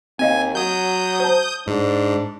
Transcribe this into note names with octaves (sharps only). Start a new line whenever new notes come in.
D#2 C4 D#5 F5 G#5
F#3 D#6 G6
C5 A5
G#2 D4